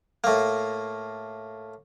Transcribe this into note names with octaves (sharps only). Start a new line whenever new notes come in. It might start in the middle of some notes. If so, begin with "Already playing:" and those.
A2 A#3